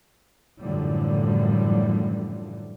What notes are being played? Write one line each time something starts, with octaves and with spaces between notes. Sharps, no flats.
F#2 A2 D3 E3 F3 G3